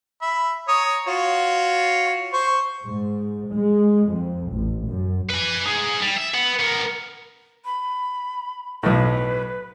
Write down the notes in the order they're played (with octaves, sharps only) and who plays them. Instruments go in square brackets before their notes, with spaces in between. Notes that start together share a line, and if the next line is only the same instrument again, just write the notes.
[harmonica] E5 B5
C#5 A#5 D#6
F4 F#4 C#5
C5 C#6
[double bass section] G#2
G#3
F2
A1
F#2
[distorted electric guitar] B4 G#5
D#4 G#4
G3
E5
B3
B3 A#4
[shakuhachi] B5
[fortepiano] B1 A2 [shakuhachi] B4